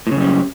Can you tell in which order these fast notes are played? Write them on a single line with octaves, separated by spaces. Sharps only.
A2 C#3 F#2 G3